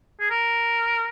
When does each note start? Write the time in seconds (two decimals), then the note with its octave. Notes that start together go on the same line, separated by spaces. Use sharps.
0.20 G#4
0.30 A#4